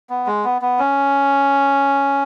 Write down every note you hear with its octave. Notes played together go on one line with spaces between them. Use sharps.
B3
G#3
B3
B3
C#4